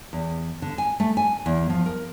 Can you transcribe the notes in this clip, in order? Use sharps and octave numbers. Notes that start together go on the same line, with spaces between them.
E2
D3
G#5
A3
G#5
E2
F3
A#4